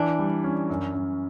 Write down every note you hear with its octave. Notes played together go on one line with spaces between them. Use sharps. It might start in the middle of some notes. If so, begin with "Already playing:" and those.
Already playing: E3 D4
G3
C#4
F#2
F#2